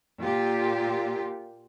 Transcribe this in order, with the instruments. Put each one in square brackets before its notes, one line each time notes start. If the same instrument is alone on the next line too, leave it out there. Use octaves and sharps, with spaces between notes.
[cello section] A#2 F4 G4